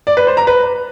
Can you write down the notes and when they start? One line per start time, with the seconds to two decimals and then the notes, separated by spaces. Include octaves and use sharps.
0.07 D5
0.17 B4
0.27 C5
0.37 A#5
0.47 B4